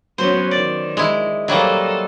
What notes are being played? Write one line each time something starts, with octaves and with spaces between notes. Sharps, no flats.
F#3 B3 C#4 C5
D#3 D5
G#3 E4
F#3 G3 A#3 A4 C5 D#5